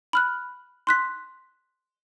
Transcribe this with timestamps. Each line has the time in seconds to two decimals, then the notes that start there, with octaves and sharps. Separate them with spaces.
0.13 B5 F6 F#6
0.87 C6 F#6 B6